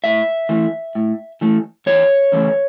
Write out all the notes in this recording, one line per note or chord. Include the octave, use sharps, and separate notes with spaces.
A2 E5
E3 A3
A2
E3 A3
E2 C#5
C#3 E3 A3